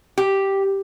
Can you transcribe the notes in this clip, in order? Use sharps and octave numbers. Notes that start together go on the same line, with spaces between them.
G4